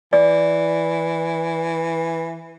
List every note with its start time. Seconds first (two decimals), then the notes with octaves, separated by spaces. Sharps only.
0.13 E3 D5